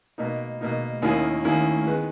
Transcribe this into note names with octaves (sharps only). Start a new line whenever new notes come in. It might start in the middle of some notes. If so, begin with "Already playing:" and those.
B2 A#3 D#4
B2 A#3 D#4
D#2 D#3 A#3 C#4 E4
D#2 D#3 A#3 C#4 E4
D#3 G#3 B3